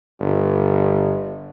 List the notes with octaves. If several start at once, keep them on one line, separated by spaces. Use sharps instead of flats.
G1